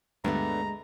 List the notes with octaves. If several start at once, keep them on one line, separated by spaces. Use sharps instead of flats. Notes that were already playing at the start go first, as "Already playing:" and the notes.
D2 G2 G#3 A3 B3 D4 A#5